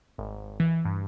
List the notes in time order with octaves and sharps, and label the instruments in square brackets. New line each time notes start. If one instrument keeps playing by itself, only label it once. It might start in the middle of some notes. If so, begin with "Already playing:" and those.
[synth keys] G#1
E3
G2